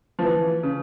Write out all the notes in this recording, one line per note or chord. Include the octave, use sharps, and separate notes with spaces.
F3
E3
C#3